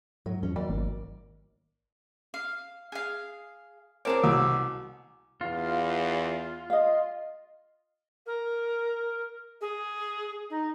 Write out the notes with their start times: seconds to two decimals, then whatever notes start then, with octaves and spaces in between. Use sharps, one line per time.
0.26 G#2 F#3
0.43 E2 C#4
0.56 D#2 F#3 D5
0.70 G#1
2.34 F5
2.92 G#4 F5
4.05 C4 G#4 A#4 C#5 A5 D6
4.23 C2 B2
5.41 E2 F4
6.70 D#5 F5
8.26 A#4
9.61 G#4
10.50 D#4